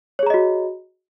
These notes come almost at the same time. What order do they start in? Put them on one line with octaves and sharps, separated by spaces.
C#5 G#4 A#5 D#5 F#4